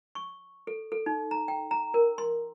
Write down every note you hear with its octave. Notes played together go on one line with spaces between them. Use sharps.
C#6
A4
A4
D#4
A#5
G5
A#5
A#4
C6